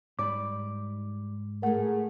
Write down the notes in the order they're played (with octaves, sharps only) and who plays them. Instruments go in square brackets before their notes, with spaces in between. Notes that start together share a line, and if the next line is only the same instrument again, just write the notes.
[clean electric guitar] G#2 A#5 B5 [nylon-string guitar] G3 D5 [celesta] D6
[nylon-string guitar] A2 A3 [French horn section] G#4 A#4 [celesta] F#5